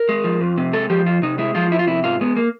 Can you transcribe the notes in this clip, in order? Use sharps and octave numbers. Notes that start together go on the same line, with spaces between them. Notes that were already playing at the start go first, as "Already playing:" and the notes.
Already playing: A#4
G#3
F3
F2
C3
G#3 A4
F3 G4
F2 F4
C3 D#4
G#3 E4
F3 F4
F2 E4
F4
C3 E4
G#2 F4
G#3 B3
A#3